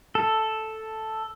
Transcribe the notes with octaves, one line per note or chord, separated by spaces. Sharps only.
A4